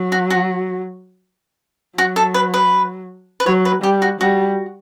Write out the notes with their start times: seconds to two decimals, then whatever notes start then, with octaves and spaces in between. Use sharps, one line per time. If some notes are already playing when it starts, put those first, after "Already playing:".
Already playing: F#3
0.12 F#4
0.30 F#4
1.98 F#3 F#4
2.16 A4
2.34 B4
2.54 B4
3.40 B4
3.46 F#3 C#5
3.65 B4
3.83 G3 G4
4.02 F#4
4.20 G3 F#4